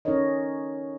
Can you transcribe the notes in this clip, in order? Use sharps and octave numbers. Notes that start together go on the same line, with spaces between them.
C#4 D#4 A4 A#4 C#5 D#5